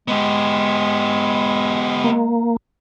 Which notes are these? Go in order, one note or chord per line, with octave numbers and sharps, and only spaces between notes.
G#3 B3 G4
A#3